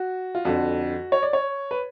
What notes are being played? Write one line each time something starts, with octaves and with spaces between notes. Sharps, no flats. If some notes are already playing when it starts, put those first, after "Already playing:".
Already playing: F#4
F4
F2 D3 F#4
C#5
D5
C#5
B4